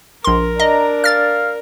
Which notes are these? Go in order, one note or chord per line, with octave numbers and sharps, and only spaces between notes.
A#1 A#4 C6
D4 D#5 A#5
F5 F6 A6